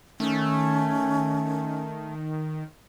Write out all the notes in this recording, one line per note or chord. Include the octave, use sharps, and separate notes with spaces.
D#3 A3 C#4